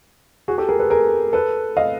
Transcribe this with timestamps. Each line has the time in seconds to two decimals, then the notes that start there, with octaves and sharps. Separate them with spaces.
0.48 F#4 G#4
0.58 G4 A4
0.68 G#4 A#4
0.79 A4 B4
0.90 G#4 A#4
1.33 A4 B4
1.77 D#5 F5